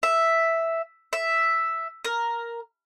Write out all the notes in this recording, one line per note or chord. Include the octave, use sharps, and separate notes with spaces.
E5
E5
A#4